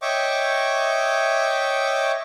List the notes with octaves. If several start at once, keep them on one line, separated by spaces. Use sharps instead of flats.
C#5 D#5 E5 G5 C#6 D6